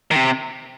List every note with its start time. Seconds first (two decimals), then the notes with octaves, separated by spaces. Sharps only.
0.11 D#3
0.16 C3